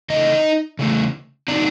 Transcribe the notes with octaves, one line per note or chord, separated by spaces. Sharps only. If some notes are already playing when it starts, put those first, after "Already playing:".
C#3 E3 A3 D#4 D#5
C#3 E3 A3
D3 F#3 B3 D4 D#4 D5